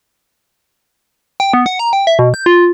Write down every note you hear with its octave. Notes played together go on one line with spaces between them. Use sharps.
G5
B3
F#5
A#5
G5
E5
B2
G6
F4